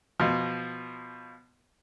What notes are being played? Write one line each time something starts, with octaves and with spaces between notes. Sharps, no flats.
B2 F3